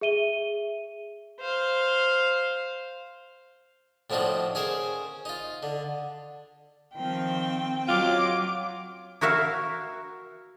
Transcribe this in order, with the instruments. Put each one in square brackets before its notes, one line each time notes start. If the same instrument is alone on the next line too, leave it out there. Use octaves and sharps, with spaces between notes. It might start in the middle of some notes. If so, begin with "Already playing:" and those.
[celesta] G#4 E5 D#7 G7
[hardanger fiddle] C5 F5
[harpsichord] A2 F3 F#3 C4 D4 D#4
C#4 G#4 A#4 C5
D#4 F4
D3
[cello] D#3 F3 [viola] C4 G5
[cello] F#3 [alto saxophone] F4 [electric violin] D6 D7
[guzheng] E4 F#4 A#4 E5 F5